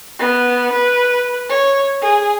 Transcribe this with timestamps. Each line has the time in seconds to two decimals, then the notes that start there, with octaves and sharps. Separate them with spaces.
0.19 B3
0.72 B4
1.49 C#5
2.01 G#4